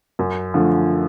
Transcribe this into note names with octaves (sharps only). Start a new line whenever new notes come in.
F#2
D3 F3 A3